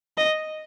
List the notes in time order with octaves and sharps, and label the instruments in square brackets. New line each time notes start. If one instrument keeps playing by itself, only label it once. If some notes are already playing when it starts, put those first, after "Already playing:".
[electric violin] D#5